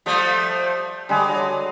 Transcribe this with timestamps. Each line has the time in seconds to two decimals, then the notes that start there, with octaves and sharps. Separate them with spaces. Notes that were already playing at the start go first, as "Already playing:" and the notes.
0.06 F3 G3 A3
1.09 D3 G3 G#3 G#4
1.28 F#3